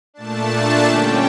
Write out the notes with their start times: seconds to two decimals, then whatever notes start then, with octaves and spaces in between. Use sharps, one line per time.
0.14 A#2 A3 D4 A5
0.84 D3 G3 C#4 G5